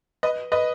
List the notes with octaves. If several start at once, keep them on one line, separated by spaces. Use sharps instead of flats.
B4 D#5
B4 D#5